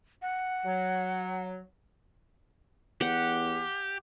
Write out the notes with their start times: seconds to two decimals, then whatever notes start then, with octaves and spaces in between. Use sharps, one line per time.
0.22 F#5
0.65 F#3
3.01 E2 G4 F#5